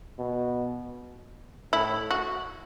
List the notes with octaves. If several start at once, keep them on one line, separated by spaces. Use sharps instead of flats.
B2
A2 E4
F#4